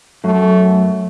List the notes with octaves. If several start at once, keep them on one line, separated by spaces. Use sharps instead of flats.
F#2 A3